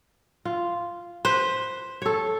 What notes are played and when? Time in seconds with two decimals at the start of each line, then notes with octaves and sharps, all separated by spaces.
0.45 F4
1.25 B4 C5
2.02 A4 C#5